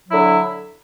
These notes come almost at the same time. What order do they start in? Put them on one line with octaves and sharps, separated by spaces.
F#3 E4 D3